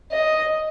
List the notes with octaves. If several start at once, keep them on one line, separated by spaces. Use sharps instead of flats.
D#5